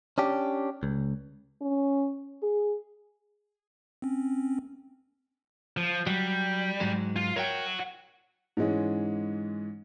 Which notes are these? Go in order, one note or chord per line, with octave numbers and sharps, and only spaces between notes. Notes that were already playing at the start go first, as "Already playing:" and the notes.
C#4 D4 G4
C#2
C#4
G#4
C4 C#4
F3
F#3 G3
G#2 F#3 G#3
F4
F#4 A#4 C#5 E5 G5
G#2 E3 G#3 C#4